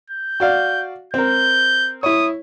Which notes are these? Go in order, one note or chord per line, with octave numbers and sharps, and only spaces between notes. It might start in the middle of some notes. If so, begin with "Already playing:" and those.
G6
F#4 D5 F5
C4 A#4 G6
E4 C#5 D#6